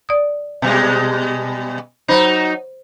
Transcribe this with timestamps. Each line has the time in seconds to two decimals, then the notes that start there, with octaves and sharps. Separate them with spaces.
0.09 D5 D#6
0.62 B2 G3 G#3
2.09 F#3 D#4 C5 B5